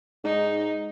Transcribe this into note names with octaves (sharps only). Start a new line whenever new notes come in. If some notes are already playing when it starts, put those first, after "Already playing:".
G#2 D#4